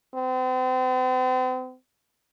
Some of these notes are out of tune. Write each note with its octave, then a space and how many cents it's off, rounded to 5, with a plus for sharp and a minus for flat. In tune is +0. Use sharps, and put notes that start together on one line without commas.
C4 -40